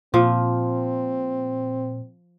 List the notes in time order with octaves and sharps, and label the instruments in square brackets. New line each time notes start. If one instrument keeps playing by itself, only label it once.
[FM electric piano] A#2 [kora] F3 [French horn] C4